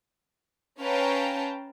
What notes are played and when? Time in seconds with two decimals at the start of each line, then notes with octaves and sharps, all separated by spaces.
0.79 C#4 B4 F5 G5 A5 A#5